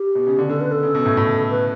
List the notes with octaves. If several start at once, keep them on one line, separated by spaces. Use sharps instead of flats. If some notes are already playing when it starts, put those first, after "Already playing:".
Already playing: G4
B2
C#3
D3
D3 A4
B4
A4
C#3
B2
A2
A2
B4